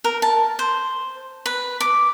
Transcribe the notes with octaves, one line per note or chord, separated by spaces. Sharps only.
A#4
A5
C5
B4
D6